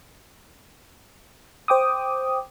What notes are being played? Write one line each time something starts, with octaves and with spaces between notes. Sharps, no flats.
C5 G5 D6 D#6